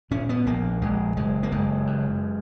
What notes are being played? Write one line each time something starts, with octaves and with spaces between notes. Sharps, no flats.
A#2 C#4
B3
A#1 A#3
A#1 G#3
F#1 G#3
A#3
F#1 G#3
F#2